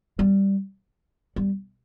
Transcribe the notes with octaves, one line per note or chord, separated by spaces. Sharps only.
G3
G3